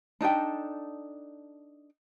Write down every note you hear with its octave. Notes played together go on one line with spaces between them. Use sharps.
D4 D#4 A4 G5